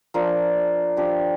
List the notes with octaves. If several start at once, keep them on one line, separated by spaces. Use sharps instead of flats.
F3 D4 A#4 D5
F3 D4 G4